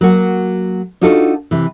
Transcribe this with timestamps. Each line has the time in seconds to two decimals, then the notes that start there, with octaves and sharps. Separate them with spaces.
0.01 F#3 A#3 F#4
1.01 D4 D#4 F4 F#4 A4
1.51 C3 E3